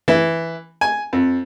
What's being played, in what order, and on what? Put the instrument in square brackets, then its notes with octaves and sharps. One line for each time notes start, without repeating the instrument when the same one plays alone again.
[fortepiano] E3
G#5
F2